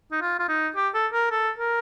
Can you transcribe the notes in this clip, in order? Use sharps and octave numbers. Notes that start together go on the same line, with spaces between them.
D#4
F4
F4
D#4
G4
A4
A#4
A4
A#4